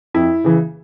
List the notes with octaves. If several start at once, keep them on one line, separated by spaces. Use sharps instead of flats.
F2 E4
C#3 E3